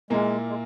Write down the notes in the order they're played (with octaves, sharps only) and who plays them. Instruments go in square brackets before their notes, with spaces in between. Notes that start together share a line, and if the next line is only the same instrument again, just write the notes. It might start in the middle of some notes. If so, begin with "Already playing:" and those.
[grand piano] A#2 A#3 E4 [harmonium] G#3
[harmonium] G#3